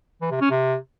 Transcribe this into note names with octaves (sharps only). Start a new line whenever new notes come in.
E3
C3
C#4
C3